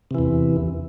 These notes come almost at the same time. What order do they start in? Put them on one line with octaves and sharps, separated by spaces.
C3 E3 E2